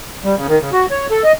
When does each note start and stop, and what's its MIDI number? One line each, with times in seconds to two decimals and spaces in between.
0.24 0.35 55
0.37 0.47 49
0.48 0.59 51
0.61 0.70 49
0.72 0.86 66
0.91 1.06 73
1.10 1.23 69
1.24 1.32 75